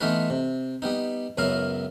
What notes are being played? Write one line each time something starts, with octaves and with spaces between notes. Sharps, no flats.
E3 A3 B3 D#4 F4 B4
C3
G3 B3 D#4
C#2 F#2 B3 E4 A#4 F5